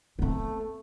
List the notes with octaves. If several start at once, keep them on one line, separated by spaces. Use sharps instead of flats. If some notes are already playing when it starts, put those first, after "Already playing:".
A3 B3 C4